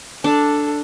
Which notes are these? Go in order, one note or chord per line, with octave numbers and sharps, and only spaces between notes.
D4 A4